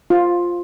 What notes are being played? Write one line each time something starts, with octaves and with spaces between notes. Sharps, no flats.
F4